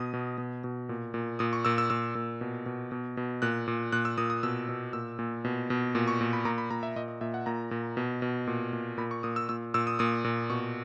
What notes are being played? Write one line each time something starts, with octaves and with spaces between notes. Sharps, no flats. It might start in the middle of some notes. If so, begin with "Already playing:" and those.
Already playing: B2 D#6
B2
B2
B2
A#2
A#2
A#2 D#6
C#6
A#2 E6
E6
A#2 E6
A#2
B2
B2
B2
B2
A#2 F#6
A#2
A#2 F#6
E6
A#2 D#6
D#6
B2 E6
B2
A#2 E6
A#2
B2
B2
A#2
C#6
A#2
B5
A#2 A#5
B5
A#2 A#5
E5
A#2 D#5
D#5
A#2 E5
F#5
A#2 A#5
A#2
B2
B2
A#2
A#2
A#2 B5
C#6
A#2 D#6
E6
A#2 E6
A#2 E6
D#6
A#2 D#6
A#2
B2 C#6